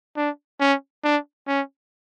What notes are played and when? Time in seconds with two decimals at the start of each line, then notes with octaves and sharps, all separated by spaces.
0.17 D4
0.60 C#4
1.04 D4
1.47 C#4